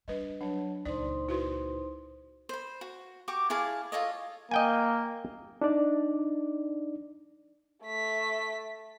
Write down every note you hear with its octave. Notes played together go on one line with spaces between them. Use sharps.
G3 D4 B4 D#5
F#3 D4 C#5 A5
C#2 A#2 D#4 C5 D5 C6
E4 F#4 B4
C5 B5
F#4
F#4 G4 C#6 D6
E4 G#4 F5 A5
F4 A4 C#5 D#5
A#3 D#5 G5 G#5
D4 D#4 D5
A3 B6